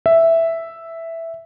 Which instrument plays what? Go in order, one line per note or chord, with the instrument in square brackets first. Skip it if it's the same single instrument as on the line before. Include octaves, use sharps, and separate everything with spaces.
[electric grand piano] E5